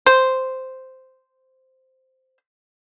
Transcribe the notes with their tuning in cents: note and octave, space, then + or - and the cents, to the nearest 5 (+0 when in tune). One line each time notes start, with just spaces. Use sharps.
C5 -5